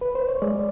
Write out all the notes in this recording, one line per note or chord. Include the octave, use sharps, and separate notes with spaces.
B4
C5
C#5
G#3 D5